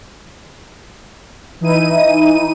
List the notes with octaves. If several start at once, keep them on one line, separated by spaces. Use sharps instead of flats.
E3 D#4 E4 D#7